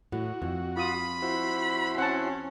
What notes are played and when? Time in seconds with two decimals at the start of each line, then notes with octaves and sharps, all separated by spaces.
0.12 A2 F#4
0.42 F2
0.77 F4 B5 D#6
1.22 E4 F#4 C5
1.98 C#4 F#5 A5